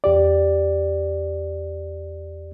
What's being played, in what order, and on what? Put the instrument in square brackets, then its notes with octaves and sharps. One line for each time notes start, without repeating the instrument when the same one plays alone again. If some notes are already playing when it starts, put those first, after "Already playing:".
[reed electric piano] E2 G4 D5